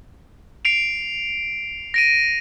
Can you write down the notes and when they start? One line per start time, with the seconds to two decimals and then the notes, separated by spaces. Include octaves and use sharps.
0.65 C7 D7 F7
1.94 A#6 D7 D#7